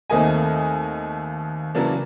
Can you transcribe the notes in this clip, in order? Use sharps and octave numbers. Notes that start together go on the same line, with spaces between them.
D#2 A3 A#3 C4 D#5 G#5
C#3 E3 F#3 A#3 D4